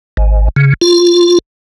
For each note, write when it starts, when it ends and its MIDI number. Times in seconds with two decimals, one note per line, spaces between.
0.17 0.48 32
0.56 0.74 49
0.81 1.39 65